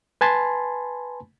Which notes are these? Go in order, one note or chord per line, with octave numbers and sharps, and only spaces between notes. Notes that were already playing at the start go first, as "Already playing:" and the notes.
B4 G#5 A5 B5 C6